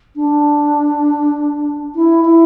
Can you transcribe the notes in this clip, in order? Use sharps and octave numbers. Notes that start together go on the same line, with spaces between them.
D4
E4
E4